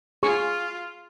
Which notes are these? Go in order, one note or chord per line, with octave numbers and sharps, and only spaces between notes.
F4 G#4 C#6